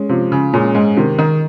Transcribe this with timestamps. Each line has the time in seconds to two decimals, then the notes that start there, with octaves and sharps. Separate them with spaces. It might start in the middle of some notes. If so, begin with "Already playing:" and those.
Already playing: G#3 C#4
0.09 C3 F3
0.32 C#3
0.53 A#2 G#3 C#4
0.75 G#2
0.97 C3 D#3
1.19 D#3